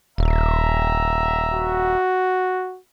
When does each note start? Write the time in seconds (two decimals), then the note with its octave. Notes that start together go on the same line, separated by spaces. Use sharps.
0.18 D#1 E5 A#5
1.54 F#4